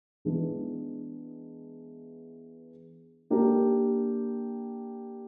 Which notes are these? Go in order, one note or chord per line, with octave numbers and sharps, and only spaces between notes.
E3 G#3 B3 D4
A#3 D4 G4 A#4